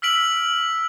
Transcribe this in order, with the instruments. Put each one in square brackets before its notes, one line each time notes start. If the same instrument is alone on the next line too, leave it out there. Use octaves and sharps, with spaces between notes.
[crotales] E6 F6 B6 D7 F#7